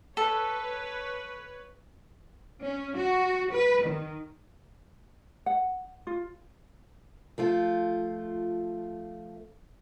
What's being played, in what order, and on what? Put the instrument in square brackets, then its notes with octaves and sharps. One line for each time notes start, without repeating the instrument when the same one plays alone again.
[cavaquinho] A4 [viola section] B4 C#5
[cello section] C#4
F#4
B4
D#3
[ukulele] F#5
F4
[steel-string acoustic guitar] F3 A3 F4